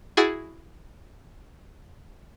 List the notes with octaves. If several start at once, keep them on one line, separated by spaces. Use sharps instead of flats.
E4 F#4 G#4 A6